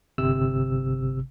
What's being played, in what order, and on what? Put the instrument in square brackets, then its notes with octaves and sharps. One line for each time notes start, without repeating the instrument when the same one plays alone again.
[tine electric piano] G1 C3 E6